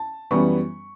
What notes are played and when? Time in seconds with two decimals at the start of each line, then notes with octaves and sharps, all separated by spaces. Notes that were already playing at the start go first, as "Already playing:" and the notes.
Already playing: A5
0.31 F#2 E3 G3 B3 C#6